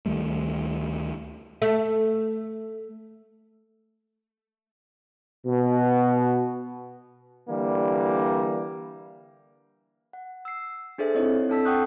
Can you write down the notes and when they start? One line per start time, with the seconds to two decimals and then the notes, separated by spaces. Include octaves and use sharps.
0.06 D2 D#3 G3 A3
1.62 A3
5.45 B2
7.49 D3 E3 G3 A#3
10.13 F#5
10.45 E6 C7
10.98 D4 G#4 A4 C5 E5
11.15 C4 D#4 E4 C#5 D#5
11.49 C4 D4 A4 A5 E6 B6
11.65 F#5 G5 C#6 D#6 F#6 G6